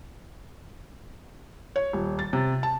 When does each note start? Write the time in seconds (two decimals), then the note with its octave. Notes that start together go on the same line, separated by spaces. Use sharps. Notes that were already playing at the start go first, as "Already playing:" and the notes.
1.76 C#5
1.93 D#1
2.19 A6
2.33 C3
2.63 A5